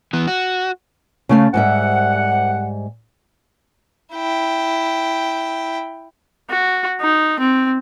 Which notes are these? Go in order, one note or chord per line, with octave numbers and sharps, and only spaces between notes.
E3 B3
F#4
C#3 A3 F5
C2 G#2 G3 G4 E5 F#5
E4 G5
F#4
D#4
C4